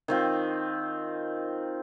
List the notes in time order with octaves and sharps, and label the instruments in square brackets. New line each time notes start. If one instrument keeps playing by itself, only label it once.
[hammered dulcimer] D#3 C4 F4